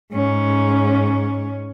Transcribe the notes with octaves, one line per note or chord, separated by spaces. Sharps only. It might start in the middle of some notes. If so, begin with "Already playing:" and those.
G#2 C#4